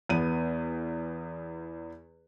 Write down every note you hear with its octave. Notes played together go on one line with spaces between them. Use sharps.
E2 B3 D#7